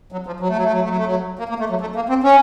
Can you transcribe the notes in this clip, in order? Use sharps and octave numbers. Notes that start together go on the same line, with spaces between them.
F#3
F3
F#3
A3
F#3
A3
F#3
A3
F#3
A3
F#3
A#3
A#3
A3
F#3
A3
A#3
C4
C#4